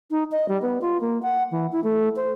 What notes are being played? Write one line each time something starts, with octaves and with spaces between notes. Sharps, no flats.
D#4
D#5
G3
B3
F4
A#3
F#5
E3
E4
A3
C5